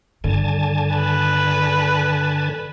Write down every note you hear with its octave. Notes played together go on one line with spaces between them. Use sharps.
G2 D3 D#3 G#5 A5
B4